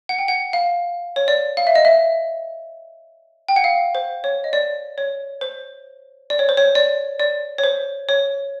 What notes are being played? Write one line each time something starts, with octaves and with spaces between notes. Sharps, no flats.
F#5
G5
F#5
F5
C#5
D5
F5
E5
D#5
E5
G5
F#5
F5
C5
C#5
D#5
D5
C#5
C5
D5
C#5
C5
C#5
D5
D5
C#5
C5
C#5